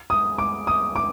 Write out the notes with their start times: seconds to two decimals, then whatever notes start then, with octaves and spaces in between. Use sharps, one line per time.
0.10 D#6
0.38 D6
0.67 D#6
0.96 D6